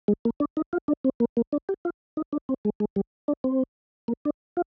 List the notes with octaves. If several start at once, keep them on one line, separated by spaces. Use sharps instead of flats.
G#3
A#3
D4
D#4
F4
D4
C4
A#3
A#3
D4
G4
F4
D#4
D4
C4
G#3
G#3
G3
D4
C4
A#3
D4
F4